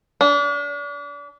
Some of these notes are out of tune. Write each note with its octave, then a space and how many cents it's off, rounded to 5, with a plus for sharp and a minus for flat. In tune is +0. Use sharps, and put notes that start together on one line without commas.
D4 -35